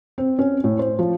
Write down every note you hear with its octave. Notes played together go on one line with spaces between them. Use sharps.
C4
C#4
A2
C5
F3